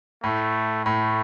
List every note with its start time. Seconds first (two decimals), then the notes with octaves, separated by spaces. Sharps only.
0.24 A2 A3
0.86 A2 A3